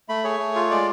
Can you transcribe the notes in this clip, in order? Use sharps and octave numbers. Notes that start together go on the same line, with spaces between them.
A3 B5
G#4 C#5
A3
F4
G#3 D5